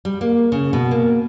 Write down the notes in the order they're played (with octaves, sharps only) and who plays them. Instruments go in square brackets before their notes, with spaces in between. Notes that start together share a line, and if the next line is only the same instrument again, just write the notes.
[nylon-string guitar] G3
A#3
C#3
B2
A#3